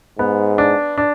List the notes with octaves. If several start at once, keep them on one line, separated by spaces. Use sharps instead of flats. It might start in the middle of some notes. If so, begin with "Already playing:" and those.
G#2 B3
D4
D4